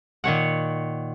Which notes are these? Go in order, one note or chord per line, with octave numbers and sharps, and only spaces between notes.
A#2 D#3 C#5 F#5